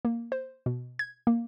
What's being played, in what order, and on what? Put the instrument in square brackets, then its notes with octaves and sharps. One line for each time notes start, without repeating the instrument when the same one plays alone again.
[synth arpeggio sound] A#3
C5
B2
G#6
A#3